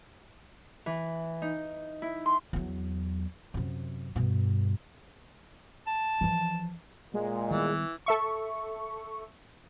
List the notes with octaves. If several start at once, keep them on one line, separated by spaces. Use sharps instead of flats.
E3
D#4
E4
C6
E2 F#3
F#2 C3
G2 B2
A5
E3 F3
A#2 G#3
D#3 E3 G3 B3
A4 E5 C#6